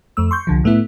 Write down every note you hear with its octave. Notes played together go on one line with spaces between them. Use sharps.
F2 A3 E6
C6 C#6 G6
C2 D3 F3
A2 A3 B3 E4